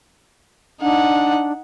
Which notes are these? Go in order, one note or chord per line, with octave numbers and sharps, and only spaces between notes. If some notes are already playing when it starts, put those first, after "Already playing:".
D4 D#4 F#5